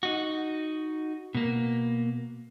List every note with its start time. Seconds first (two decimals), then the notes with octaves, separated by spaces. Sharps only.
0.03 D#4 F#4
1.35 B2 A#3